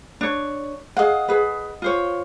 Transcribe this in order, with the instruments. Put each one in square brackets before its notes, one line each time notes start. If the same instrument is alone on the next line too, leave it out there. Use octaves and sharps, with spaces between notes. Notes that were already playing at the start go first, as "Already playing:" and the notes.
[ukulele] D4 C#5
[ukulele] G#4 F5 [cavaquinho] D#5 F#5
[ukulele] G#4 B4
F4 C5 C#5